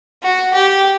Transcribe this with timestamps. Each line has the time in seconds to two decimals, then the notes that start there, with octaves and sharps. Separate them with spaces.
0.22 F#4
0.54 G4